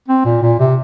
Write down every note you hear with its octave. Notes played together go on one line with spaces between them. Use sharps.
C4
A#2
A#2
C3